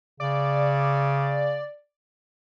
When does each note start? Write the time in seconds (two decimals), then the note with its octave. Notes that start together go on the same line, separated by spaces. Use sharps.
0.20 C#3 D5